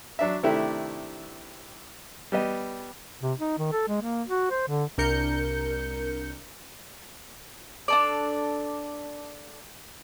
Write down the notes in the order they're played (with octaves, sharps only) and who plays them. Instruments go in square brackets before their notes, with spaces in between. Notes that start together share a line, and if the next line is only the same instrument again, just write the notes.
[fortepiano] F#3 D4 E5
C3 D#3 A3 D4 E4 G4
G3 B3 D#5
[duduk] C3
D#4
D#3
A4
G#3
A#3
F#4
C5
D3
[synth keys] C2 D4 A#4 G6 C#7
[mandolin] D4 A4 D5